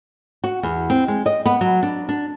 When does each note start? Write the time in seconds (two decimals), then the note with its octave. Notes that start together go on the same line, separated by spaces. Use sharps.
0.44 F#4
0.63 E2
0.90 C4
1.08 G#3
1.26 D#5
1.46 B3
1.61 F#3
1.83 D4
2.09 D4